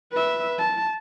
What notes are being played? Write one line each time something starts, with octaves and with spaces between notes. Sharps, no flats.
B4 E5
A5